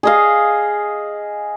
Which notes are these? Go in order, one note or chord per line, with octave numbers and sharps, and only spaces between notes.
G#4 D#5 F5